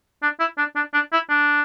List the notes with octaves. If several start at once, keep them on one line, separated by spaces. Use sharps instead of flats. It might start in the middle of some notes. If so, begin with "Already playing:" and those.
D4
E4
D4
D4
D4
E4
D4